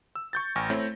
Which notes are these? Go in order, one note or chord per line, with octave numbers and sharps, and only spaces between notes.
E6
C#6 G6 A6
A1 G5 G#5 C#6 F6 A#6
A3 C4 E4 C#5 G6